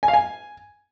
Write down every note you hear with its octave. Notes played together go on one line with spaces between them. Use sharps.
G#5
F5
G#5